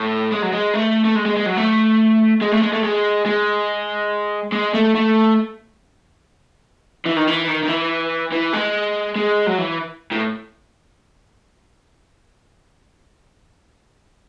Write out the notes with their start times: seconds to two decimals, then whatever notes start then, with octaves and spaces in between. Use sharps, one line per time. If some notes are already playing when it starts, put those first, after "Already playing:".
Already playing: A2
0.32 G#3
0.42 F#3
0.53 G#3
0.74 A3
1.05 A3
1.16 G#3
1.26 G#3
1.37 G#3
1.47 F#3
1.57 A3
2.42 G#3
2.52 A3
2.63 G#3
2.73 A3
2.84 G#3
3.26 G#3
4.52 G#3
4.74 A3
4.95 A3
7.06 E3
7.16 D#3
7.27 E3
7.47 D#3
7.63 D#3
7.68 E3
8.32 E3
8.53 G#3
9.16 G#3
9.47 F#3
9.58 E3
10.11 A2